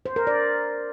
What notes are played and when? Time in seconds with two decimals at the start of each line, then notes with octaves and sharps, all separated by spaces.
0.06 C5
0.16 A#4
0.27 D5